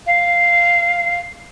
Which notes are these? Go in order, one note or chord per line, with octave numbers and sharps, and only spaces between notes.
F5